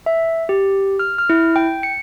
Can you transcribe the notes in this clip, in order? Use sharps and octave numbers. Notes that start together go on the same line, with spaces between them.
E5
G4
F6
F6
E4
G5
C#7